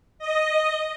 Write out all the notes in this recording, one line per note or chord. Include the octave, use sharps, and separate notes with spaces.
D#5